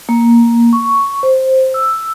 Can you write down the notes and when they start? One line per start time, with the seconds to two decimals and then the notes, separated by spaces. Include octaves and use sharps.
0.09 A#3
0.73 C#6
1.23 C5
1.74 E6